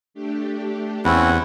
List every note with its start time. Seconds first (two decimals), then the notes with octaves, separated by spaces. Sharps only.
0.14 A3 D4 G4
1.05 E2 C4 C#4 E4 F#5